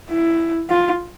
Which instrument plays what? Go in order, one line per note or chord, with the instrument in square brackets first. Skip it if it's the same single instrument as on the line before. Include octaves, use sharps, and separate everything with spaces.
[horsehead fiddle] E4
F4